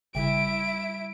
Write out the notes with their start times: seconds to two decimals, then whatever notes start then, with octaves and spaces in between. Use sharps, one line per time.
0.15 G1 C#3 G3 E4 E5 D7